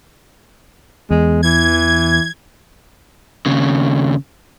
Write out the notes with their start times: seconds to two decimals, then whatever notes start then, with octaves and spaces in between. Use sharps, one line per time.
1.10 E2 G#3
1.43 E3 G#6
3.46 D#2 C#3